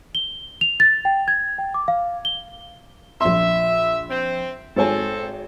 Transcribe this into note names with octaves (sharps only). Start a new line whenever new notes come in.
G7
F7
A6
G5
G#6
G5
D6
F5
G7
A#1 E5 C6
C4
G#1 C4 A4 C#5 G#5